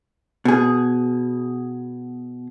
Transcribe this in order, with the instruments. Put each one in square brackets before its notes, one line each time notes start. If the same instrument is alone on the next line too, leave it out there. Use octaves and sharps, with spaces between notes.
[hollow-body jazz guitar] B2 G#4